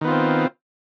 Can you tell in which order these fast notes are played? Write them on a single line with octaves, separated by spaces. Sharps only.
D#3 B3 F4 C4